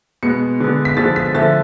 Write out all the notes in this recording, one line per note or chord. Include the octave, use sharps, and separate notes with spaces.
B2 G#3 B3 C#7
D3 G#3 B3
B6
D3 F3 G#3 B3 A6
B6
D3 F3 A3 A6